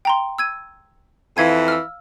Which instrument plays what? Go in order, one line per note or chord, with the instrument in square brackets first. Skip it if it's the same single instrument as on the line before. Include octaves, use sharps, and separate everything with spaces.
[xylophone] G5 A#5 C6
E6 G#6 D#7
[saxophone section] F2 E3 [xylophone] F5 G#6 D#7
[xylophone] E6 F6